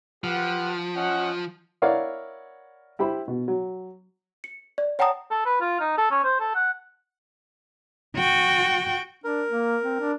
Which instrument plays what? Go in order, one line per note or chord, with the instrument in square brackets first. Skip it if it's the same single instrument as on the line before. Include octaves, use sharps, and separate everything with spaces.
[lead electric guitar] F3 [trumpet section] G4 B4 F#5
[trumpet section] C#4 D#5 F#5
[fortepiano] E4 A#4 C#5 D5 F5 F#5
E4 G4 C5 B5
B2
F#3
[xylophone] C#7
D5
C#5 F#5 G5 A5 A#5 D#6
[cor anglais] A4
B4
F4
D#4
A4
C#4
C5
A4
F#5
[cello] F#4 G5
[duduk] D4 [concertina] A#4
[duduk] A#3
C4
D4